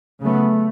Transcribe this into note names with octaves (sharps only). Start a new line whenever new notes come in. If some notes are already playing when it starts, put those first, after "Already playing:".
C#3 F#3 A3 B3